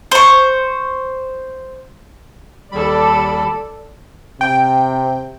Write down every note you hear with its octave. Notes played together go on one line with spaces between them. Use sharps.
C5 C#6
D#2 G3 A4 D5 B5
C3 G5